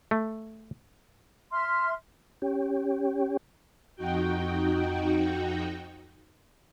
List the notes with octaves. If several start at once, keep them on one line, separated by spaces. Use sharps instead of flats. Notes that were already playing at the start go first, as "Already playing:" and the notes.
A3
E5 C6 F6
C#4 G4
F2 D#4 F#4 G5